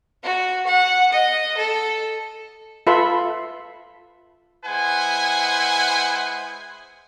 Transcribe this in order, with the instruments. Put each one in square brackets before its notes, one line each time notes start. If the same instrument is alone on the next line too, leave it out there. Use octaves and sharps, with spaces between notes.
[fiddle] F#4
F#5
D#5
A4
[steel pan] F4 A4 B4 E5 B5 C6
[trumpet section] G#3 E4 B4 C5 F#5 G#5